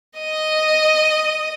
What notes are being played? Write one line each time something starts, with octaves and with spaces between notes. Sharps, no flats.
D#5 D#6